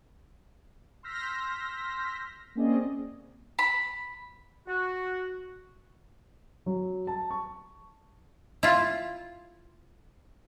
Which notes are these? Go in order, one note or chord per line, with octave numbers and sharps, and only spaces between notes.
C6 E6 F6 G6 A#6 B6
A#3 C4 C#4 G#4 D5 D#5
B5
F#4
F#3
A5
C#6
E4 F4